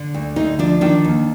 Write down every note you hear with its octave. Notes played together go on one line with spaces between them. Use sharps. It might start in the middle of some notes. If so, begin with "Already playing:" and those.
Already playing: D3
D2
D2 D#4
F3 D4
D#3 D4
D#2